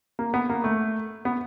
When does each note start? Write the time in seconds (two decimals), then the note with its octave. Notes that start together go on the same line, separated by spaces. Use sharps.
0.19 A#3
0.34 B3
0.50 A#3
0.64 A3
1.25 B3